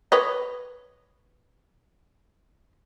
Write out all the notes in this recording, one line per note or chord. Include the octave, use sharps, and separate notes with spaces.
B4 C#5 D#5